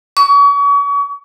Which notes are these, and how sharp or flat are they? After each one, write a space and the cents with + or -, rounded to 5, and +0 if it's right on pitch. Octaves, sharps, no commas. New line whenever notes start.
C#6 +40